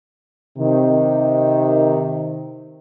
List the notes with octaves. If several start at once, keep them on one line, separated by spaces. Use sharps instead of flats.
C3 D#3